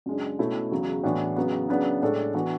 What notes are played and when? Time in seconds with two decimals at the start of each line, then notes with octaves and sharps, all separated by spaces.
0.06 F#2 C#3 G#3 D4
0.39 B2 A3 C#4 E4
0.71 E2 C#3 F#3
1.03 A2 E3 B3 D4 F#4
1.36 C#3 F#3 B3
1.69 C#3 F#3 B3 D4
2.02 A2 G#3 D4 A4
2.34 E3 B3 D4 F#4